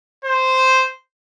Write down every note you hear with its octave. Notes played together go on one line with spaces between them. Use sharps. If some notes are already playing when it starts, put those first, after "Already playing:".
C5